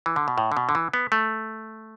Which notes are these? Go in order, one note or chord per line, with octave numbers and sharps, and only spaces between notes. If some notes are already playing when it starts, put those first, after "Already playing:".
E3
D3
B2
A2
D3
B2
D3
E3
B3
A3